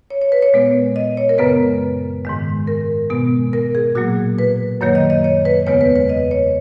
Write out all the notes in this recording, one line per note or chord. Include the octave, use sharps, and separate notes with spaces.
C#5
C#5
B4
C#5
A#2 G#3 B3
D#5
C#5
A#4
F#2 C#3 G#3 B3 B4
G#2 D#3 G#3
A#4
B2 G#3 B3
A#4
G#4
A#2 F#3 A#3 F#4
B4
F#2 D#3 F#3 A#3 C#5
D#5
D#5
C#5
B4
E2 C#3 G#3 B3 C#5
B4
B4
D#5
C#5